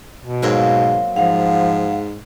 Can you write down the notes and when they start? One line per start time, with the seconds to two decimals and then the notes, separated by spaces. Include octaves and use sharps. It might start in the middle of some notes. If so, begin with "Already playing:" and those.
0.25 B2
0.43 G#2 F#3 A#3 C4
1.16 G#2 F3 F5 F#5